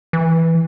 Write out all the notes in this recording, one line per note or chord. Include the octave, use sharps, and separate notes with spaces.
E3